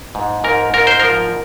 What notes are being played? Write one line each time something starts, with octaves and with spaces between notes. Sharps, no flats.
G#2
G#2 A#4
G#2 A#4
C5
F3 A#4